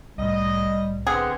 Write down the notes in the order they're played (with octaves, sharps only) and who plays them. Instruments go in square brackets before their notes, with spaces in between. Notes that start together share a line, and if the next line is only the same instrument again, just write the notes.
[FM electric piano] C2 A2 [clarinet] G3 [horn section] D#5
[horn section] D3 B3 C4 [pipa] G#4 [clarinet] F#5